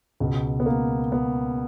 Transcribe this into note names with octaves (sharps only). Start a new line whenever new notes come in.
C#2 B2
B3
A#3
B3